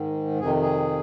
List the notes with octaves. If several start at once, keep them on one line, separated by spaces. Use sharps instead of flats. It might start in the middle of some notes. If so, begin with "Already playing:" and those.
Already playing: G#2 D#3
F2 C3 D#3 G#4
G#4